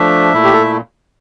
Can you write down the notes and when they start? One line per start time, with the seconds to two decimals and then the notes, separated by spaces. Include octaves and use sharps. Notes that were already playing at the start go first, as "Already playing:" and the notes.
Already playing: F3 A3 D4 E5
0.33 A#2 A3 E4
0.44 G4
0.53 A4